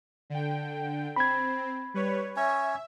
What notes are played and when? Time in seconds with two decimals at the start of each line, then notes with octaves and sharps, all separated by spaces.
0.30 D3 G5
1.16 C4 B5 G#6
1.94 G3 B4 C#5
2.36 C#4 C#5 E5